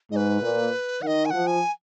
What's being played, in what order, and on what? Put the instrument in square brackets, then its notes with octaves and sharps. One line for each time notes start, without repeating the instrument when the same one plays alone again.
[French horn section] G#2 [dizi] D#5
[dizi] B4
[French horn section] A#2
[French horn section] D#3 [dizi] D#5 F#5
[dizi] G#5
[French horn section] F3 [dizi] F#5
[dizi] G#5